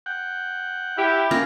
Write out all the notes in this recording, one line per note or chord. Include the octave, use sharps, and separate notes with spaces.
F#5 G5
E4 G4
A#3 C#4 F4 A#4